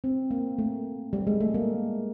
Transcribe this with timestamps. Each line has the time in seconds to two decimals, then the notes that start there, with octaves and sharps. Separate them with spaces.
0.04 C4
0.31 A#3
0.58 A3
1.13 G3
1.27 G#3
1.41 A3
1.54 A#3